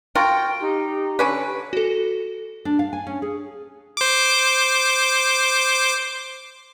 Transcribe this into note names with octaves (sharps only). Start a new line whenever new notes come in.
F4 F#4 A#4 G5
D#4 G4
D3 C#4 B4
F#4 A4
D4
F5
G#5
C#4
G#4
C5 D6